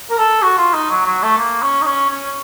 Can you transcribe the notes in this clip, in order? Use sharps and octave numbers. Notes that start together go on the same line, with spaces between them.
A#4
A4
F#4
F4
D#4
F#3
F#3
A3
A#3
C#4
D#4
C#4
C#4